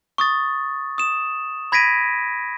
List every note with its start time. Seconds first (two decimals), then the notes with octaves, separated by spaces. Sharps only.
0.18 C#6 D#6 A6
0.98 D#6 E7
1.72 B5 G#6 A#6 B6 D7 D#7